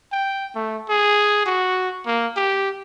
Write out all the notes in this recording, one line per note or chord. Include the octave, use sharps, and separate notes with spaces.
G5
A3
G#4
F#4
A#3
G4